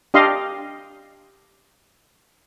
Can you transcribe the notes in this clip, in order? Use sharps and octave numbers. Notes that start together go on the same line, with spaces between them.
D4 G4 D#5 F5 C6